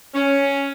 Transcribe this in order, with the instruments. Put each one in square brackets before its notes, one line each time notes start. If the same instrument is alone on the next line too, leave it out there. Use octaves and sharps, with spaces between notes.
[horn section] C#4